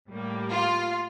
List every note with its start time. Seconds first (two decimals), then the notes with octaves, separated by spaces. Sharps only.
0.09 A2 G3 A#3
0.51 F4